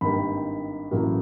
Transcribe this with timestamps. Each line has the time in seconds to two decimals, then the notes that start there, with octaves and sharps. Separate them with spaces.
0.01 G#1 G2 D#3 G3 A#3 B5
0.91 A1 A2 F#3 A#3